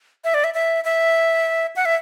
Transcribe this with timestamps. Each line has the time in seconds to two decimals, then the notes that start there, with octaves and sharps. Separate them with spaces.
0.24 E5
0.34 D5
0.44 E5
0.54 E5
0.85 E5
1.76 F#5
1.85 E5